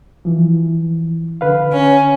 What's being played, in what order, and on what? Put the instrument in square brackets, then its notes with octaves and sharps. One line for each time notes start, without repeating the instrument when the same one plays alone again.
[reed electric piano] E3 F3
D3 B4 F5
[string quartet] C#4